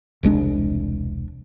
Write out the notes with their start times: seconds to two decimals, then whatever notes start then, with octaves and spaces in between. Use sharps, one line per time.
0.23 E1 C2 G#3 D4